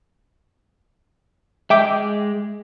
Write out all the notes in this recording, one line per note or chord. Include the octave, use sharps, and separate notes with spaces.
G#3 E5 G5 D6